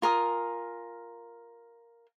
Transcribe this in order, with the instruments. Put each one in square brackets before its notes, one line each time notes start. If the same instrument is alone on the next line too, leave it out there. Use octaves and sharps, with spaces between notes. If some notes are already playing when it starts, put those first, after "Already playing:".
[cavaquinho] F4 A#4 G#5 D#6